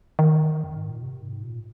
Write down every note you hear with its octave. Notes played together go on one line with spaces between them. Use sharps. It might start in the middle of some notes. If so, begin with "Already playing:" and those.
D#3
F2
G#2
A#2
C3
G#2
A#2